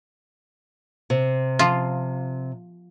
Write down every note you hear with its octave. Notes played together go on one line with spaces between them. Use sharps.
C3
F3 F4